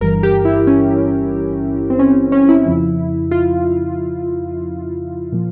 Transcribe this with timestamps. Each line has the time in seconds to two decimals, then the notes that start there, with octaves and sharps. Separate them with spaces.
0.01 G1 G2 E3 A#4
0.23 G4
0.45 E4
0.67 C#4
1.90 C4
1.99 C#4
2.32 C#4
2.49 E4
2.66 F2 C#3 F3
3.31 F4
5.32 A#2 F3